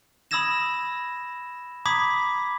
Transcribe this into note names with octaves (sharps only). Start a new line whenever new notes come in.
B5 D#6 E6 G#6 A#6 E7
A#5 B5 D6 D#6 G#6 B6